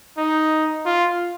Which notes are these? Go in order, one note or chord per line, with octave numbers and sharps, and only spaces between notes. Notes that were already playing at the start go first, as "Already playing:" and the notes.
D#4
F4